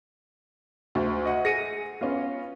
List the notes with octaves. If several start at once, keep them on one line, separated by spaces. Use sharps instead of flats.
D2
D#5 F#5
G#4 A#6 C#7 D#7
B3 C#4 F4